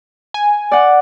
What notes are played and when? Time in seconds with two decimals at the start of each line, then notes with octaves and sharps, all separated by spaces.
0.34 G#5
0.72 D5 F#5